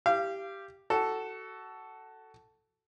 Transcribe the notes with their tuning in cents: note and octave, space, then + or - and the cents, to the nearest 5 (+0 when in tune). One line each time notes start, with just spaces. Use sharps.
G4 +0 F5 -30
F#4 +20 A4 +0